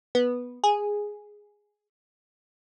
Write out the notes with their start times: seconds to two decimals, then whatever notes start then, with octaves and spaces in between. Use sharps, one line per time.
0.15 B3
0.64 G#4